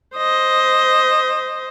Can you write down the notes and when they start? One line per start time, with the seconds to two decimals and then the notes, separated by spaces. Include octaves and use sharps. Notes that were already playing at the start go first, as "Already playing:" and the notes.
0.16 C5 D#5